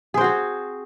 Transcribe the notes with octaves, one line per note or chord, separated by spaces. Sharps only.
C4 F#4 G#4 C5